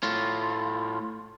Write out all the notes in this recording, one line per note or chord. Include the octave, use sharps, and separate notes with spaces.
A2 F4